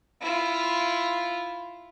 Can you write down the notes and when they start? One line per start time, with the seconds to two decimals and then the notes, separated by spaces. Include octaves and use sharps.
0.21 E4 F4